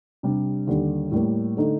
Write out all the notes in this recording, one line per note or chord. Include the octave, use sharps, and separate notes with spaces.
C3 G3 D4
D#2 D3 G3
A2 G3 A#3
D3 A3 D#4 A4